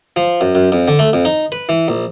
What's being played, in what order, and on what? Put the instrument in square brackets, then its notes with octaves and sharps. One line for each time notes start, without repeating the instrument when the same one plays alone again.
[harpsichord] F3
F#2
F#2
F2
D3
A3
F2
D#4
B4
E3
A#1